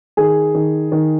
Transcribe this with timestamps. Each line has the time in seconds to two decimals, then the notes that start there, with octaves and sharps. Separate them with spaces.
0.17 D#3 G#4
0.54 D#3
0.92 D#3